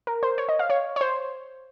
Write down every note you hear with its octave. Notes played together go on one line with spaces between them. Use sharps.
A#4
C5
C#5
D#5
F5
C#5
C#5
C5